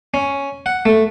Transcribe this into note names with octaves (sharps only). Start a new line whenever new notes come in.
C#4
F#5
A3